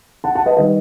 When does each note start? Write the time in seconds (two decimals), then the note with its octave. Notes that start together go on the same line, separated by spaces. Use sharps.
0.24 F#5 A5
0.35 F#5 A5
0.46 B4 D#5
0.57 D#3 G3 B4 D#5